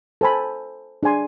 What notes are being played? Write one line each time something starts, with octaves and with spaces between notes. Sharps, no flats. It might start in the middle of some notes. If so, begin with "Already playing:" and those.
A4 C5 G#5 B5
D4 G#4 D5 G#5 C6